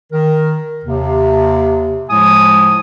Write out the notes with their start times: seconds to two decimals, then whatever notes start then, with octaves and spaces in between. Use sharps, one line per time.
0.12 D#3 A#4
0.85 D#2 C3
2.09 A2 F3 G#3 G#5 D#6